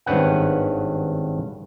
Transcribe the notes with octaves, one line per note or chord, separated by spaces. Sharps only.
G#1 G2 C#4 B4 F#5